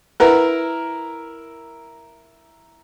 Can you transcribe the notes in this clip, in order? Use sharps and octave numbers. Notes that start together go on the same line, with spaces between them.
E4 A#4 B4 F#5